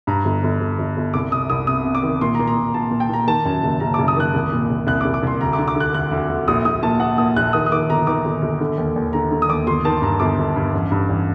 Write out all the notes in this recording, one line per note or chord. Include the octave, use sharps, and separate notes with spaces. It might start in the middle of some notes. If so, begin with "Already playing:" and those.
G2 A#5
G1
G1
G1
G1
G1
C2 D6
C3 D#6
C2 D#6
C3 D#6
C3
D6
D#3
A#2 C6
A#5
A#2
A#5
A#2
A#2 A5
A#2
G5
A#2 A#5
D#3 A5
F#2
F#1
F#1 A#5
F#1 D6
D#6
D#3 F#6
C2
A#2
C2
C2 F#6
D6
C2
D6
C2 C6
D2 A#5
D6
D3
D6
D3 F#6
D2 F#6
D2
D2
A#1 D#6
A#1 D#6
A#2 A5
A#2 F#5
A#2 D#6
A#1 F#6
D#3 D#6
D#6
D#3 D6
G1 A#5
D#3 D6
G1
G1
D3
D#2
D#2
D3 A#5
D3
D#6
D#2 D6
G1 C6
D#3 A5
G2 A#5
G1 D6
G1
G2
A1
G2
A1